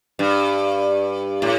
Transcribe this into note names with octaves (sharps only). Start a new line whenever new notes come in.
G2
A2